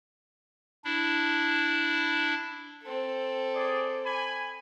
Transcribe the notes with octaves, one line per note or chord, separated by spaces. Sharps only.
D4 E4
C4 A4
G#4 D5
G#5 B5